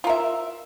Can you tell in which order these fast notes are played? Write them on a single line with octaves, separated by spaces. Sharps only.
F4 A#4 E5